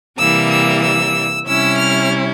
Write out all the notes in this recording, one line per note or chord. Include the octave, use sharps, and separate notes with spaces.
C3 E3 G3 A#3 E6
E6
E6
C3 G3 C#4 E4 E6
F6